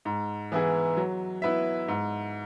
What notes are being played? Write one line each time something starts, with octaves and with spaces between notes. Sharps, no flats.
G#2
E3 B3 E4 G#4
F#3
B3 E4 B4 E5
G#2